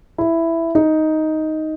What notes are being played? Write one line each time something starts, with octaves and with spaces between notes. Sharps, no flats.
E4
D#4